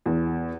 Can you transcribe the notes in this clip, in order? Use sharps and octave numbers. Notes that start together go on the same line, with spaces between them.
E2